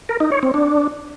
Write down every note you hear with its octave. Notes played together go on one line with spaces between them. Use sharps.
A#4
D#4
C#5
C4
D4